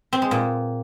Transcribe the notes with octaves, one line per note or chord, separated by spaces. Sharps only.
C4
G#3
A#2